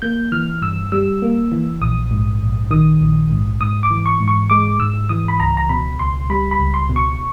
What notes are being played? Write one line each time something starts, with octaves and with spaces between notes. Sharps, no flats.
A#3 G6
E3 F6
G2 E6
G3 E6
A#3
E3
A#1 D#6
G#2
A#1
D#3 D#6
A#1
G#2
G#2 D#6
D6
E3
C#6
G#2
C#6
G#3 D6
G#2 E6
E3 D#6
B5
C#2 A#5
A#5
B2 B5
C#2 C6
G3 B5
B5
C#2
C6
B2
C#6